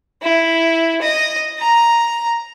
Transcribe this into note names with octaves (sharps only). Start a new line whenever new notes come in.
E4
D#5
A#5